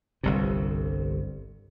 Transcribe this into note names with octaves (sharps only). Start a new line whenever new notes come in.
G1 C2 C3